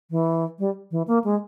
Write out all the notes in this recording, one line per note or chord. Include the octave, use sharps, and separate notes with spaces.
E3
G3
E3
A#3
G#3